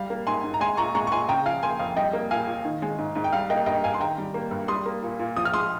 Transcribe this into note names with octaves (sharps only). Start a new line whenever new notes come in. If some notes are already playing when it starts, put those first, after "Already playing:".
Already playing: G3 F5
A#3
G#2 G#5 C6
G#2
A#5
G#3 G#5 C6
A#2 A#5 C#6
G#3 A#5 C#6
C#6
A#2 G#5 C6
C#3 G5 A#5
F3 F5 G#5
A#3 G#5 C6
F2 F5
G3 D#5 G5
A#3
A#2 F5 G#5
A#2
D#3
G#3
G#2
G#2
G5
G3 F5
A#3 D#5 G5
G2 D#5 G5
G2 F5 G#5
C6
D#3 G5 A#5
G3
A#3
G2
G3 C6 D#6
A#3
A#2
A#2
F3 D#6
F6
G#3 C6 D#6